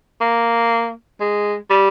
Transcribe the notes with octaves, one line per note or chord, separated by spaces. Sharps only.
A#3
G#3
G3